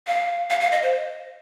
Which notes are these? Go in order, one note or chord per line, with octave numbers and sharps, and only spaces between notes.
F5
F5
F5
D#5
C5